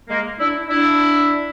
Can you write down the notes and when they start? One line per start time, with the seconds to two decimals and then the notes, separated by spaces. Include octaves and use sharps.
0.08 G#3 A#3
0.39 D4 E4
0.69 D4 E4